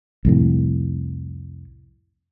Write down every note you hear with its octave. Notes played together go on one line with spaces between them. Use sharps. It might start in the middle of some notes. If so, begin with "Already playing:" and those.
C2 F2 A2